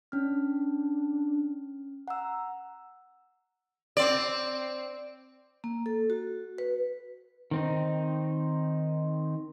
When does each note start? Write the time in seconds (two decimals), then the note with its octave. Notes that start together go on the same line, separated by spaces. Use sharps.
0.12 C#4 D4 F6
2.08 F#5 A#5 E6
3.97 C4 D5
5.64 A#3
5.86 A4
6.10 F#4
6.58 B4
7.51 D#3 C4 D#4